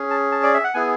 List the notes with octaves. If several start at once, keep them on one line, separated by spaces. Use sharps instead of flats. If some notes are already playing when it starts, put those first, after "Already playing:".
Already playing: C#4 G#4
A5
A5
D5
E5
F#5
B3 E4 G#4 G#5